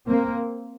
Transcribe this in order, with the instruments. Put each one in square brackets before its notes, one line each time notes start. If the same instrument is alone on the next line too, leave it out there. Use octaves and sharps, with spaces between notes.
[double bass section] A#3 C4